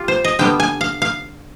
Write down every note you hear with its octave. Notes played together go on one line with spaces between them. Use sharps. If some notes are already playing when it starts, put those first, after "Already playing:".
Already playing: F4 G4
C5
D#5
D3 G3 B3 G5
G#5
F5
F5